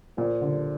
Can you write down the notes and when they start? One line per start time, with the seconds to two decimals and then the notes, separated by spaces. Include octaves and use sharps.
0.17 A#2 F3
0.41 D3